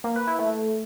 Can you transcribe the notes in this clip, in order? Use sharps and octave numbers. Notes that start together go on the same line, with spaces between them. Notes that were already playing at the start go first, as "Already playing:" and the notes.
A#3
B4
E4
A3